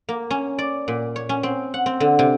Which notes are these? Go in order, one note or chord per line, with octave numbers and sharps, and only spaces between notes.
A#3
C#4
D5
A#2
C#5
C#4
C4
F#5
C4
D3
C3